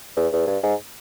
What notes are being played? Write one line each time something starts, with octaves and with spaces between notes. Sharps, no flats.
E2
E2
G2
G#2